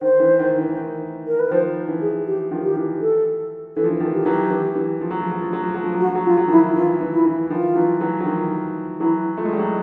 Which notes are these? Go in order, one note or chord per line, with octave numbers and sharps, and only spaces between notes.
D#3 C5
E3
D#3
E3
D#3
A#4
B4
D#3 F3 C5
E3
G#4
G4
D#3 F3
G4
E3
A4
E3 A4
F3
E3
D#3 F3
G4
E3 F#3
E3
E3
F3
F#3
F3
F#3
F3
F#3
F3
F#3
F3
F#3
F#4
F3
F#3
F3 F4
F#3
D#3 F3 E4
E3 F4
E3
E4
E3
D#3 F3 F4
E3 F#3
E3 F#3
F#3
D#3 F3
E3 F#3 E4
A3 F4
G#3
G3
F#3 G#3